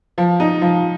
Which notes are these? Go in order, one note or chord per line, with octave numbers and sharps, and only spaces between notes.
F3
D#4
F3